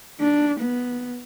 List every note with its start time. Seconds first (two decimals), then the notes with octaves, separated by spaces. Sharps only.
0.20 D4
0.60 B3